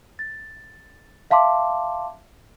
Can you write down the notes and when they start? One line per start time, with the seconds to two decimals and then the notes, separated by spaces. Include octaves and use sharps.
0.19 A6
1.31 E5 F5 A5 C6 D6